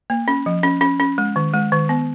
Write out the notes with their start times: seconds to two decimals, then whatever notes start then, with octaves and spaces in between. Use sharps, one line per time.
0.10 A#3
0.28 C#4
0.46 F3
0.63 C#4
0.81 C#4
1.00 C#4
1.18 G#3
1.36 D#3
1.53 G#3
1.72 D#3
1.89 B3